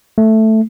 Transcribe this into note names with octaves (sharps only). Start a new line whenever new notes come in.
A3